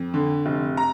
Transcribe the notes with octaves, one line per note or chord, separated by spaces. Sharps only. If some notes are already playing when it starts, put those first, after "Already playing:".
Already playing: F2
D3
F1
A#5